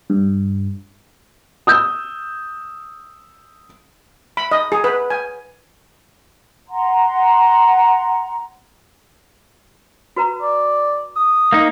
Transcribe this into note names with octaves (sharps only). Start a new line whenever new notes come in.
G2
D#6 E6 G6
B5
D#5
G#4
B4
G#5
F#5 A#5 C6
F#4 B4 A#5
D5
D#6
A#3 D#4